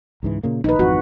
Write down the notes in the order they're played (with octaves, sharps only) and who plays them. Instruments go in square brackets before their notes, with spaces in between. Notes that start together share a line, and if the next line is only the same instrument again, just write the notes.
[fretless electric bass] C#2 G#2 E3
A#2 C#3 A#3
[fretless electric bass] A#1 D#3 [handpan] D#4 B4
[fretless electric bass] G#1 F2 E3 [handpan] F#4